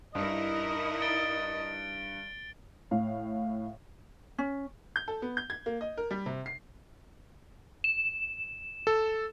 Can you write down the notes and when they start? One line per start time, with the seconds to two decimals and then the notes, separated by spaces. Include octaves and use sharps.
0.15 G2 D#4 E4 A#4 D#5
1.02 A6 D7 G7
2.91 A2 F5
4.38 C#4
4.96 G6
5.08 A4
5.22 B3
5.37 G6
5.50 G#6
5.66 A#3
5.81 D#5
5.97 A#4
6.11 G3
6.26 C3
6.46 C7
7.84 E7
8.87 A4